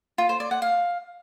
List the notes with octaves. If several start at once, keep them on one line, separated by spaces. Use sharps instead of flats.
F4
C5
D5
F#5
F5